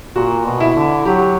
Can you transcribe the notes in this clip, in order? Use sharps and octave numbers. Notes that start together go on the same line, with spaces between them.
A#2 F#4
B2
E4
D3
F#3 G4